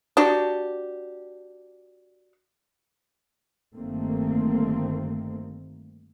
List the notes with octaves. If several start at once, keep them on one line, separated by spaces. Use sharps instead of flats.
D4 F#4 G4
G1 G2 D#3 A3 A#3 C4